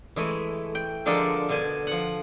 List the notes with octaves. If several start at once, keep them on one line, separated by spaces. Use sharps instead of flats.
E3 G#3 A3
G5
D3 F3 G#3 D4 A4 A#4
B2 D3 G#5
F3 F#5